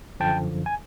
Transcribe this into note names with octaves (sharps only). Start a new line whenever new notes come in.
F#2 D3 F3 G5 A5
G#5